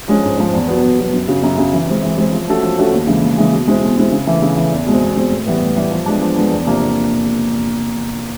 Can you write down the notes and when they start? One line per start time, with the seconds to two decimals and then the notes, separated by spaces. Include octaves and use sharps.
0.08 F3 G#3 C#4
0.23 G#2
0.38 F3 G#3 C#4
0.53 E2
0.68 B2 F#3 B3
0.83 E2
0.98 B2 F#3 B3
1.13 F#2
1.28 C#3 F#3
1.43 F#2
1.58 C#3 F#3
1.73 E3
1.87 G#3 C4
2.02 E3
2.18 G#3 C4
2.32 F3
2.48 A3 C#4 F#4 A4
2.63 F3
2.78 A3 C#4 F#4 A4
2.92 D#2
3.07 C#3 E3 G#3
3.22 D#2
3.37 C#3 E3 G#3
3.52 B2
3.68 G#3 C4 E4
3.82 B2
3.97 G#3 C4 E4
4.12 C#3
4.27 E3 A3
4.42 C#3
4.57 E3 A3
4.72 E2
4.86 B2 G#3 C4
5.01 E2
5.16 B2 G#3 C4
5.32 A2
5.47 E3 G3 B3
5.61 A2
5.76 E3 G3 B3
5.91 F3
6.06 G#3 B3 D4
6.21 F3
6.36 G#3 B3 D4
6.51 E2
6.66 C3 F3 A#3 D4